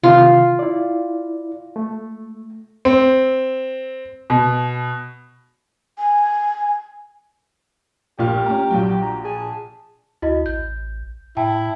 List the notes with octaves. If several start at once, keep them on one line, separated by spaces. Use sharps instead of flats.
C3 D#3 F4
E4 D5
A3
C4
B2
G#5
A#1 A#2 G4 F6
A3 C#4 A#5
A#1 F#3 F#4 G5
A#5
G#4 A5
D2 E4 F#4 D#5
A1 G6
A2 E4 G5 A5